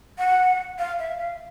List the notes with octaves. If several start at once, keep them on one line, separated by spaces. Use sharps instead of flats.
F#5
F5
E5
F5